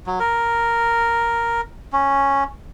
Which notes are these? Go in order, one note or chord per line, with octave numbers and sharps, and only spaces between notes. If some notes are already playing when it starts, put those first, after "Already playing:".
F#3
A#4
C#4